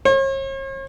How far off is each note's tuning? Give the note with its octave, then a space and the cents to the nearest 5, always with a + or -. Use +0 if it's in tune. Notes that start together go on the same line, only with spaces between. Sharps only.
C#5 -45